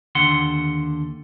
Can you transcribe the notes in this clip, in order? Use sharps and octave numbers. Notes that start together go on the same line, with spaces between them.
D#2 D3 F#5 C6